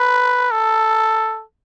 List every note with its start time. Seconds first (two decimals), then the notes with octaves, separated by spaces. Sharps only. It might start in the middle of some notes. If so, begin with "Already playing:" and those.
Already playing: B4
0.51 A4